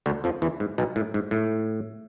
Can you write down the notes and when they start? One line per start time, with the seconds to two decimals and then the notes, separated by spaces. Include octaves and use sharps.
0.06 D2 D3
0.24 F2 F3
0.42 E2 E3
0.60 G#2
0.78 B1 B2
0.96 A2
1.14 G#2
1.31 A2